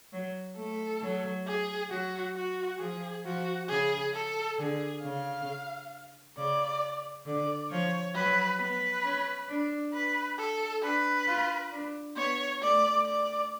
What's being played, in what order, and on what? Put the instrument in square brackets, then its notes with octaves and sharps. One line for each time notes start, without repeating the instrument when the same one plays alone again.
[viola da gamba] F#3
[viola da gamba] A3 [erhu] A4
[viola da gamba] F#3
[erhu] G#4
[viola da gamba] F#3 [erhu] F#4
[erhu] F#4
[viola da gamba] F3 [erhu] G#4
[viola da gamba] F3 [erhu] F#4
[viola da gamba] C#3 [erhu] G#4
[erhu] A4
[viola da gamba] D3 [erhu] G#4
[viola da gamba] C#3 [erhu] F5
[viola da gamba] C#3 [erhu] D5
[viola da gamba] D3 [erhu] D5
[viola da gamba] F3 [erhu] C#5
[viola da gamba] F#3 [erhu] B4
[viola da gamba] B3 [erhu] B4
[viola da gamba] C#4
D4
[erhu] B4
A4
[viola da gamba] D4 [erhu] B4
[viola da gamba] F4
D4
[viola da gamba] B3 [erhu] C#5
[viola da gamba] A3 [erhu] D5
[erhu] D5